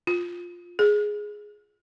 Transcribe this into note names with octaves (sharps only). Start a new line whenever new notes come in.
F4
G#4